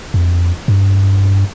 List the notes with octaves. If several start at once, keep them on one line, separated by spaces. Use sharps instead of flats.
F2
G2